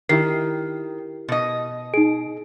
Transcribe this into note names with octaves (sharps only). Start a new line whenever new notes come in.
D#3 E4 G4 A#4 C7
B2 D#5
D#4 G#4 D7